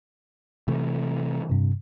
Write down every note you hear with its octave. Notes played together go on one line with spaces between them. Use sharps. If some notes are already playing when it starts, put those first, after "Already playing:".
C3 E3 A3
G2 C3